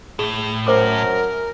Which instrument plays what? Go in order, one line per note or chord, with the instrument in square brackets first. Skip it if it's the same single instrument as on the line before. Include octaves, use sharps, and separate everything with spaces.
[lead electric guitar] A2 [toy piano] G#4
[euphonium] F#2 [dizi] A#4 [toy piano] C5 D6